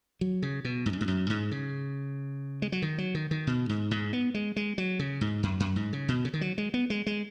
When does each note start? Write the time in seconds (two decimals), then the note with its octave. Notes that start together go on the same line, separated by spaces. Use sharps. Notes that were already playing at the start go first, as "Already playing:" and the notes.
0.21 F#3
0.42 C#3
0.65 B2
0.86 G#2
0.93 F#2
1.01 G#2
1.08 F#2
1.30 G#2
1.51 C#3
2.62 G#3
2.72 F#3
2.82 D#3
2.98 F#3
3.15 D#3
3.31 D#3
3.47 B2
3.69 G#2
3.91 G#2
4.13 B3
4.34 G#3
4.56 G#3
4.78 F#3
4.99 C#3
5.21 G#2
5.43 F#2
5.60 F#2
5.76 G#2
5.93 C#3
6.08 B2
6.25 C#3
6.34 D#3
6.41 F#3
6.58 G#3
6.74 B3
6.90 G#3
7.06 G#3